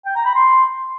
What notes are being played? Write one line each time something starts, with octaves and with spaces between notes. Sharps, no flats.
G5
A#5
B5
C6